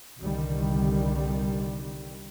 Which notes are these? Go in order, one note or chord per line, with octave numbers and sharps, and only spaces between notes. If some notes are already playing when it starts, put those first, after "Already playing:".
C2 D3 D#3 G3